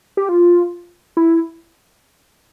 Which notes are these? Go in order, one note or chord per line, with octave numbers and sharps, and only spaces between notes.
G4
F4
E4